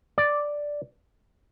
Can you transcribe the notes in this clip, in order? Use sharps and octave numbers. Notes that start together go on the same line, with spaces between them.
D5